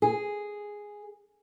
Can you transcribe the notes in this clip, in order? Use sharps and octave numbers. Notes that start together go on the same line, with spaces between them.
G#4